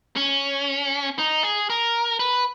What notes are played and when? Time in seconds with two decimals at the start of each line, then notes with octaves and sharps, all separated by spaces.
0.16 C#4
1.19 D#4
1.43 G#4
1.70 A#4
2.20 B4